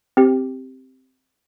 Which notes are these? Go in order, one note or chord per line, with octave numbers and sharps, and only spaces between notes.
C4 G4